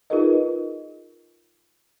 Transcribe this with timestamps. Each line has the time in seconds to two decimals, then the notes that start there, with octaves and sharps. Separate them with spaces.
0.10 D#4 F4 G#4 A#4 B4 D#5